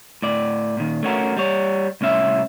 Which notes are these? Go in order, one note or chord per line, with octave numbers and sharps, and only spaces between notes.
A2 D5
A#2 D#3
A3 C#4 F#4 A#4
G3 C#5
C2 A2 C#4 E5